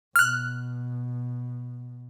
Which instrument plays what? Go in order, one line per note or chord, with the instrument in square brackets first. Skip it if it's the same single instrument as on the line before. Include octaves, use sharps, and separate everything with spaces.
[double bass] B2 [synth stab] F6 F#6